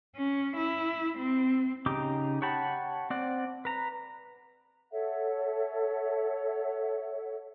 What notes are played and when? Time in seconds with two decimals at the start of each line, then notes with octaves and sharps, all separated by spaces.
0.16 C#4
0.57 E4
1.18 C4
1.86 C#3 D#4 G4 D6
2.42 C#5 F#5 G5 A5 B5
3.10 C4 D5 F#5
3.65 B4 A#5
4.92 A4 C#5 E5 F#5